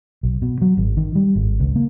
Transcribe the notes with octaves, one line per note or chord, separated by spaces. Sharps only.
B1
B2
F#3
G#1
D#3
G3
G#1
C#2
A#3